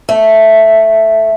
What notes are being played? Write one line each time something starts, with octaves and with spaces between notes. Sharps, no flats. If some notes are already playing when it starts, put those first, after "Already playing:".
A3